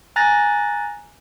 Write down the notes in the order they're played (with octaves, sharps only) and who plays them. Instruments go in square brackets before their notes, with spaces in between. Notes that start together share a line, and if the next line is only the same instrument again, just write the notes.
[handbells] G#5 A#5 F#6 A6 A#6